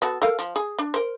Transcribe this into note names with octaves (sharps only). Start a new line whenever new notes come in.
B3 F#4 A4
A4 A#4 F5
F3
G#4
D4
A#4 C5